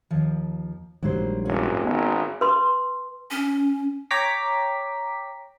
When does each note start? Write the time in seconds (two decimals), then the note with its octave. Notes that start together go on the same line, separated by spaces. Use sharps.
0.11 D#2 F3
1.03 A#1 G#2 F#3 G3 A#3 C5
1.45 F1 C#4 F#4
1.85 G#1 B3
2.41 B4 C6
3.31 C#4
4.11 C#5 G5 A#5 D6 B6